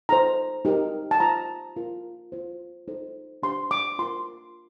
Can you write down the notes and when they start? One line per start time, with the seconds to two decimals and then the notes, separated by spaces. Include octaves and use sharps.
0.09 D#4 A4 C5 A#5
0.65 D#4 G4 A#4
1.11 A5
1.20 F4 C5 A#5
1.76 F4 A#4
2.32 F4 C5
2.88 D#4 A4 C5
3.43 D4 G4 C5 C6
3.71 D6
3.99 F4 A#4 C6